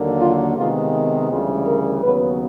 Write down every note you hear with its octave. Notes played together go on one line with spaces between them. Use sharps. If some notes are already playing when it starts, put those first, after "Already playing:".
Already playing: D#2 D3 F#3 A#3
F4
C3 D#3 G#3 B3 F4
D2 C#3 E3 G3 F4
A#4
D#2 C#3 F#3 B3 B4